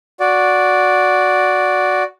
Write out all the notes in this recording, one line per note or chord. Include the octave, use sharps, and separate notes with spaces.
F#4 D5